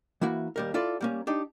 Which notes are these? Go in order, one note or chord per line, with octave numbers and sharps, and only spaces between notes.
E3 A#3 E4 F#4
D#2 G3 A#4
E4 F4 A4 D5
G3 A#3 C#4
D4 D#4 G4